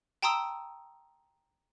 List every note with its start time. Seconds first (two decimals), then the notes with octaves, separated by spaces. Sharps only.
0.22 G5 A5 A#5 C6 D#6 E6